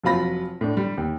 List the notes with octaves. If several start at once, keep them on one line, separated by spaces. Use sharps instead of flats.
F1 F#3 F4 B5 A#6
A2 D4
G3
D#2